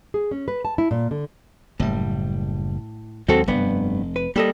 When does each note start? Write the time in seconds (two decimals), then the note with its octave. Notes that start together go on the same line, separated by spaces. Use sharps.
0.14 G#4
0.31 C#4
0.48 B4
0.65 A5
0.78 E4
0.91 A#2
1.11 D3
1.80 F#1 A2 G3
3.28 D#2 F#3 G#3 C4 F#4 A4
3.48 F1 G2 B3
4.16 B4
4.36 G3 A#3 A4 D#5